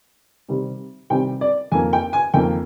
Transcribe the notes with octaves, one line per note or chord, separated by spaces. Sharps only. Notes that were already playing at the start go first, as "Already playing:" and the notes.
C3 D#3 G3 C4
C3 D#3 G3 C4 G5
D5
F2 D#3 A#3 G#5
G5
G#5
F2 D#3 A#3 G5